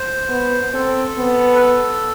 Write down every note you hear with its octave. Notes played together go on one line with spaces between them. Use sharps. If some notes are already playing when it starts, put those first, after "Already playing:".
Already playing: C5
B3
C4 A4
B3
B4
A4